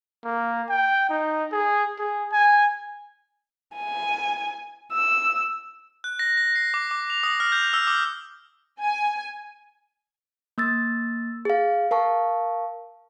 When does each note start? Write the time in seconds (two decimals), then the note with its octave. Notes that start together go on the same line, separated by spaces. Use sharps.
0.24 A#3
0.69 G5
1.10 D#4
1.52 G#4
1.99 G#4
2.32 G#5
3.77 G#5
4.93 E6
6.04 F#6
6.19 A#6
6.37 A#6
6.56 C7
6.74 D6
6.91 D6
7.10 F7
7.23 D#6
7.40 F6
7.52 G6
7.73 E6
7.87 D6
8.80 G#5
10.58 A#3 E6 A6
11.45 G#4 F5
11.91 A#4 F5 A5 C#6